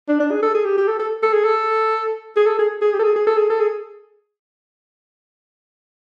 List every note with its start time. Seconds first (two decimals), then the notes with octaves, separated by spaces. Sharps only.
0.08 D4
0.20 D4
0.31 G#4
0.42 A4
0.54 G#4
0.65 G4
0.77 G4
0.88 A4
0.99 A4
1.23 A4
1.33 G#4
1.45 A4
2.36 G#4
2.47 A4
2.59 G#4
2.82 G#4
2.93 G4
2.99 A4
3.04 G#4
3.16 G#4
3.27 A4
3.37 G#4
3.50 A4
3.60 G#4